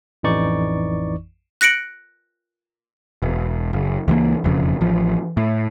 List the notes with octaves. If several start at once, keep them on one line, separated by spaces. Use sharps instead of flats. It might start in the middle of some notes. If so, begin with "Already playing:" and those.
A1 F2 E3 D#4 D5 C#6
F#6 A#6 C#7 D7 F#7
E1
F#1
C#2 E3 F#3 A#3
E1 F2 C#3
A1 F3
A2